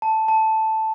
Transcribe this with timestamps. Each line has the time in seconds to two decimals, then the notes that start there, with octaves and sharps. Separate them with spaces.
0.02 A5
0.28 A5